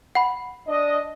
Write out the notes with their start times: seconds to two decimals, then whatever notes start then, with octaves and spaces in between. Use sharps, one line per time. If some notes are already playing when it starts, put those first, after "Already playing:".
0.15 F#5 B5
0.67 D4 D#5